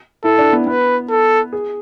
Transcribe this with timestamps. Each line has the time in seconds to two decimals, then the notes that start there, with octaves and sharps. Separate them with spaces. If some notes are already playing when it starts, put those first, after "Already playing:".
0.24 E4 A4
0.38 D4
0.53 B3
0.67 B3 B4
1.10 A4
1.53 G#4